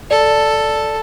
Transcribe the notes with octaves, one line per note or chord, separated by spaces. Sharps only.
A4 D5